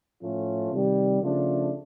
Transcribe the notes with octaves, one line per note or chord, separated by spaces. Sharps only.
A2 F3 A3 C#4 F4
C3 D#3 G3
C#3 F3 A3 D4 F4